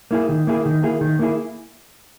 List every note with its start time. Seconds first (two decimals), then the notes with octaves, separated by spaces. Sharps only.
0.11 A#3 E4 G#4
0.29 D#3
0.47 A#3 E4 G#4
0.66 D#3
0.83 A#3 E4 G#4
1.01 D#3
1.19 A#3 E4 G#4